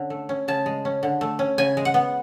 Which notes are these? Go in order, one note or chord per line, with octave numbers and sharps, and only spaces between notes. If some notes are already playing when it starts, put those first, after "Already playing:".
Already playing: D3 C#4
A3
C#4
C#3 A5
G#3
C#4
D3
A3
C#4
C#3 G#5
G#3
F#5
B3